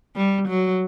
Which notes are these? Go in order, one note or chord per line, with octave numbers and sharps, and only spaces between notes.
G3
F#3